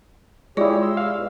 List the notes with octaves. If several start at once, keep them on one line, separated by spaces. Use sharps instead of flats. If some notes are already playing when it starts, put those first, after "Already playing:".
G#3 E4 F4 G4 G#4 C#5 D5
C6 E6
F5
B2